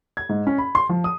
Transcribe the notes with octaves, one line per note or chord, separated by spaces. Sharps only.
G#6
G#2
C#4
B5
C6
F3
D#6